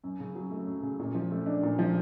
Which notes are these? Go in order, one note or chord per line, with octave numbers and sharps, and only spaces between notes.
F#2
C#3
F#3
A3
F#2
C#3
A#2
F3
A3
D4
A#2
F3